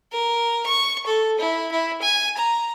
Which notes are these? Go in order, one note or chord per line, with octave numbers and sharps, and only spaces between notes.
A#4
C#6
A4
E4
E4
G#5
A#5